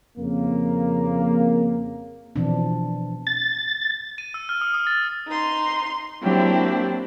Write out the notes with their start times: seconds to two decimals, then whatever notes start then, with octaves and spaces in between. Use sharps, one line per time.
0.18 F2 C#3 A#3
2.36 B2 E3 F3 C4 D4
3.27 A6
4.18 D#7
4.34 E6
4.49 F6
4.61 D#6
4.74 D#6
4.87 A6
5.28 D#4 C6
6.21 F#3 A#3 C4 D4 E4 G4